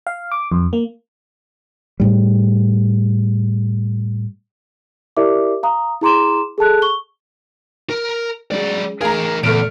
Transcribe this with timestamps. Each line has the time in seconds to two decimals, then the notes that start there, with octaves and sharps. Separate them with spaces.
0.07 F5
0.32 D6
0.52 F2
0.73 A#3
2.00 A2 G3
5.17 E4 G4 A#4 D5 E5 D6
5.63 F5 A#5 D#6
6.01 E4 G#4 A#5 C6 D6 E7
6.58 G#4 A4 A5 F#6
6.82 C#6 G7
7.90 A#4
8.52 F#3 G#3 C#4 G#4 D5
9.01 E3 A3 G#4 A#4 F5 A#5
9.43 E2 A#2 C#3 G#3 A3 F6 D7